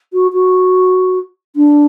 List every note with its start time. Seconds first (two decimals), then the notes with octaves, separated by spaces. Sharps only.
0.13 F#4
0.33 F#4
1.56 D4